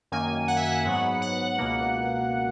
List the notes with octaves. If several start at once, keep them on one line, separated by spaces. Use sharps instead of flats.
F#2 D#3 A#3 G#5
F#5
E5
F#5
G#2 F#3 B3
F#5
C#2 B2 A#3